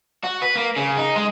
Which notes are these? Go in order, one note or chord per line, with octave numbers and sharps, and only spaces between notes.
F#4
B4
A#3
C#3
D#4
G#3